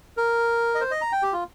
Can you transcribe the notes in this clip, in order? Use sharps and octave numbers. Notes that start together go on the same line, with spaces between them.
A#4
D#5
C5
D#5
A#5
G5
G4
F4